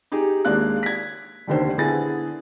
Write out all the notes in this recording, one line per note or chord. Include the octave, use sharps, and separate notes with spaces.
D#4 G4 G#4
D#2 G#3 A#3 D4 F5 F#6
G#6 B6
F1 D#2 D3 D#3 C5
D3 B3 E4 G#4 G#5 A6